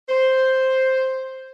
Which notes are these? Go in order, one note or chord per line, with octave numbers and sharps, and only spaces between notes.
C5